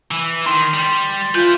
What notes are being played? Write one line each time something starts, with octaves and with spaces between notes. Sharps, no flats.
E3
D#3 C6
G3
E4 F4 B4 G6